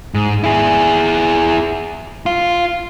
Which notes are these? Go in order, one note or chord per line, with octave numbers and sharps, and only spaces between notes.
G#2
E4 G#4
F4